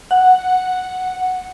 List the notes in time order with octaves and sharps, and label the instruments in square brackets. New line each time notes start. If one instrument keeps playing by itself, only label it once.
[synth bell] F#5